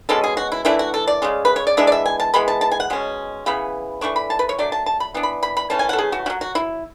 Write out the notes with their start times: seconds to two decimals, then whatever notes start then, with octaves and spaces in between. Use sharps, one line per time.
0.09 B2 G#3 C#4 A4
0.24 G#4
0.37 F#4
0.52 E4
0.65 E3 A3 D4 E4
0.79 F#4
0.94 A4
1.07 D5
1.22 C#3 G#3 C#4
1.45 B4
1.56 C#5
1.67 D5
1.77 E3 G#3 B3 D4 E5
1.87 D5
1.92 E5
2.06 G#5
2.20 A5
2.33 E3 G#3 B3 B5
2.48 A5
2.61 A5
2.72 G#5
2.80 F#5
2.90 B2 G#3 C#4
3.46 C#3 E3 B3 B5
4.01 E3 A3 D4 C#6
4.16 B5
4.30 A5
4.39 B4
4.49 C#5
4.59 F#3 A3 D4 D5
4.72 A5
4.86 A5
5.00 B5
5.14 E3 B3 D4
5.23 B5
5.43 B5
5.57 B5
5.70 E3 A3 C#4 A5
5.79 G#5
5.89 F#5
5.93 A4
5.99 G#4
6.12 F#4
6.26 C#4 F#4
6.30 F#3
6.41 F#4
6.55 E4